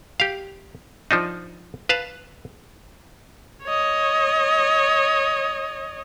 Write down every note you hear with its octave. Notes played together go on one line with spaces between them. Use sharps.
G4 F5
F3 D4 D#4
B4 F5 A5
C#5 D#5